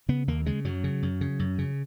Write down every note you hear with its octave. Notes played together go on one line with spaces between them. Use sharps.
C#3 B3
D#2 A#3
C#3 G#3
F#2 F#3
C#3
F#2
C#3
F#2
C#3